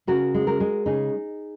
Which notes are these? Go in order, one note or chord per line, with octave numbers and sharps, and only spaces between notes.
C#3 F#4 A#4
G#3
F#4 A#4
G#3
C#3 D#4 G#4